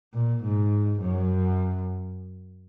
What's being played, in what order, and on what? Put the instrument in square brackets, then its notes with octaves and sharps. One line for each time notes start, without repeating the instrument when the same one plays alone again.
[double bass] A#2
G#2
F#2